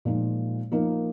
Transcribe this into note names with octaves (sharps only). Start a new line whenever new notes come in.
A#2 F3 G#3 D#4
F3 A#3 D#4 A#4